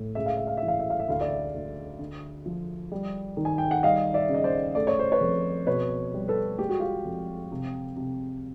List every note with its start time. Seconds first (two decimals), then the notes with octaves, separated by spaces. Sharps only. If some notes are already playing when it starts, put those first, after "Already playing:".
Already playing: A2
0.15 C#2 E5
0.26 F5
0.37 E5
0.47 F5
0.57 E3 E5
0.68 F5
0.80 E5
0.90 F5
0.99 E5
1.08 D2 F5
1.21 D5 E5
1.54 D2
1.99 D3
2.46 F3
2.92 G3
3.37 D#3
3.45 G#5
3.58 G5
3.71 F#5
3.83 G3 D#5 F5
4.14 D5 E5
4.29 C#3
4.35 D#5
4.44 C5 D5
4.75 A3 D5
4.87 C#5
4.99 C5
5.12 B4 C#5
5.21 F2
5.67 B2 B4 C#5
6.14 G3
6.28 A4 B4
6.58 G#3 G4
6.69 F#4
6.80 F4 G4
7.05 F2
7.52 C3
7.96 C3